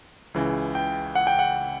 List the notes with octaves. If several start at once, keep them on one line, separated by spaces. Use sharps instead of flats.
C#2 C#3 E3
G5
F#5
G5
F#5